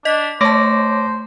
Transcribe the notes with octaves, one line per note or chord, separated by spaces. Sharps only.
D4 D#5 B6
A3 C5 C#5 A5 D6 A#6